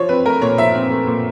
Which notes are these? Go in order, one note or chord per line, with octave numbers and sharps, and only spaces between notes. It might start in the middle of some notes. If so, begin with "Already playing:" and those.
Already playing: F3 C#5
C4 B4
A3 A#4
A#2 C#5
F3 E5
C4
A3
A#2